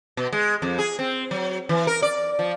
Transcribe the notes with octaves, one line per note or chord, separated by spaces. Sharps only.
B2
G#3
F2
G#4
C4
F#3
E3
A#4
D5
F3